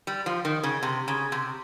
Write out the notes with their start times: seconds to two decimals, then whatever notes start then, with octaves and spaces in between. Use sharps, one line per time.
0.07 G3
0.26 F3
0.45 D#3
0.63 C#3
0.83 C3
1.08 C#3
1.32 C3